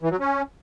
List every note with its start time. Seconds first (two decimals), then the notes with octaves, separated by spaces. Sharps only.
0.02 E3
0.11 F#3
0.20 C#4